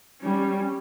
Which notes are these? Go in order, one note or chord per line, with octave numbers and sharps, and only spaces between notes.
G3 C#4